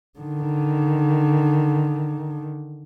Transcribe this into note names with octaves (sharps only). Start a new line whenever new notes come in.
D3 D#3